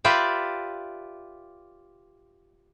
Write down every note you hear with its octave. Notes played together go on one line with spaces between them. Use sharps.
F4 G4 B4 D5 E5